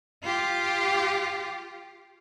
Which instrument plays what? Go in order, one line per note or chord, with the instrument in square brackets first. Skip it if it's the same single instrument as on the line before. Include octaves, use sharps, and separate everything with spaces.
[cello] F4 G4